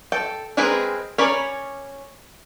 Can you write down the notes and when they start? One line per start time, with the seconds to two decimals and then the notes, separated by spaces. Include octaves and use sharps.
0.12 A4 G5
0.57 G#3 C4 G#4 A#4 B4
1.18 C#4 A#4 C#5 D5 B5